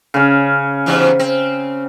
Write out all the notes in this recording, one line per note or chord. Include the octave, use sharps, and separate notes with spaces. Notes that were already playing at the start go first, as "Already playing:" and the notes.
C#3 C#4
E2 G#2 C3
C4